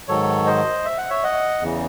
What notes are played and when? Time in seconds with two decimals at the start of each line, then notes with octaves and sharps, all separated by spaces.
0.08 G#2 D#3 F#3 A4 C#5
0.46 C5 D#5
0.85 E5
0.98 F#5
1.10 C#5 E5
1.24 D#5 F#5
1.61 E2 C#3 E3